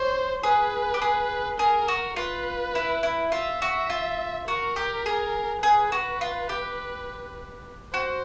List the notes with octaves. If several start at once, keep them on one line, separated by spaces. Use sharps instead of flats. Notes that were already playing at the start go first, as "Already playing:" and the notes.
Already playing: C5 C#5
G#4 B4
G4
G#4
G#4 A#4
F#4
F4 B4
E4
E4
F4 E5
F#4
F4
F#4 A#4
G4
G#4
G#4 B4
F#4
F4
G4
F#4 C5